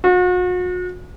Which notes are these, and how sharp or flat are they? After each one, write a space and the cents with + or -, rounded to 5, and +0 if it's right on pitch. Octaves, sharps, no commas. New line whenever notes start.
F#4 -40